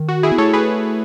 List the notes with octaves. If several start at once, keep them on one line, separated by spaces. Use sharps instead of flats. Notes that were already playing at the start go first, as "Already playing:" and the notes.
Already playing: D#3
F#4
E4 G#4
B3
A3 A4 C#5
G#4 B4